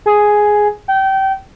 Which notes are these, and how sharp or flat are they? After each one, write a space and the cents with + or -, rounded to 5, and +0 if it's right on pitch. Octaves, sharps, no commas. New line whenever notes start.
G#4 +5
G5 -25